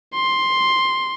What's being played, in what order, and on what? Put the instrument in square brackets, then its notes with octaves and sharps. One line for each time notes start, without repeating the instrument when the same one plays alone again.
[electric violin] C6